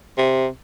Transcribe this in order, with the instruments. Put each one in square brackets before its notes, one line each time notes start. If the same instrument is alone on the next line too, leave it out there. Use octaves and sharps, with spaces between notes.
[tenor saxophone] C3